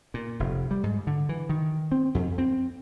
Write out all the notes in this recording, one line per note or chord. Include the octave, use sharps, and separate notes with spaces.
A#2
F1
G3
G#2
D3
E3
D#3
C4
F2
C4